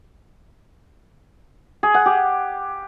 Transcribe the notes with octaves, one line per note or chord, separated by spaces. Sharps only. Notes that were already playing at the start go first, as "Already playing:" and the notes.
G#4
F#5
G4